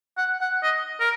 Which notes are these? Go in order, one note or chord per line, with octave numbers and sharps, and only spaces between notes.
F#5
F#5
D#5
A#4